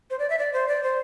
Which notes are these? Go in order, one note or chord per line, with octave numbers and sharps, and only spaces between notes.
C5
D5
E5
D5
C5
D5
C5